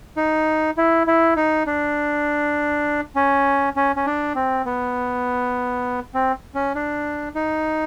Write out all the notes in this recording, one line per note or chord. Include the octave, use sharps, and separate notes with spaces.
D#4
E4
E4
D#4
D4
C#4
C#4
C#4
D4
C4
B3
C4
C#4
D4
D#4